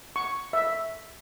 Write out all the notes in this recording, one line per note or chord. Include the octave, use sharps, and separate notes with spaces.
C#6
E5